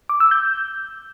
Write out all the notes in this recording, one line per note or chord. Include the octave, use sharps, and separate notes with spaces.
D6
E6
G6